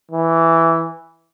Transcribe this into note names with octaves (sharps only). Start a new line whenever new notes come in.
E3